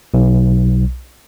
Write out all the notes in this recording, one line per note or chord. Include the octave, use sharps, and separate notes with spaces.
B1